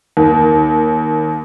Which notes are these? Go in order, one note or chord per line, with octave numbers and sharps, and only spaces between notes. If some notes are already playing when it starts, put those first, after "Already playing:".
D#2